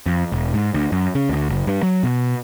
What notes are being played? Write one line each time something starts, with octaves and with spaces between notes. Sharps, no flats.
F2
E1
G#2
D2
F#2
C#3
D2
F#1
G2
F#3
B2